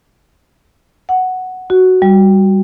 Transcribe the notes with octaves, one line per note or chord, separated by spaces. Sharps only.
F#5
F#4
G3